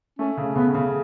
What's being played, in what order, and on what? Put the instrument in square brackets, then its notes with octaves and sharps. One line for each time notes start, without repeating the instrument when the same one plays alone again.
[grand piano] A3 [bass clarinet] C#4
[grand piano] C#3
[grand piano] C#3 [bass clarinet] B3
[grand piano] C#3